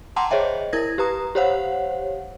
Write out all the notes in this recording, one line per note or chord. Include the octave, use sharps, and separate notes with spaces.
F#5 G5 A5 A#5 C6 D6
G#4 C5 C#5 D#5 E5 G5
E4 A#4 G#6 A#6
G4 B4 A#5 D#6
G4 C5 C#5 F5 F#5